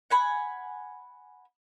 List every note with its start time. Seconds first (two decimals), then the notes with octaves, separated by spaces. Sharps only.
0.10 F#5 G#5 B5